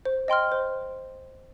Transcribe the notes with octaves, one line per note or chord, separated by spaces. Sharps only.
C5
D#5 G5 C6 F6
C5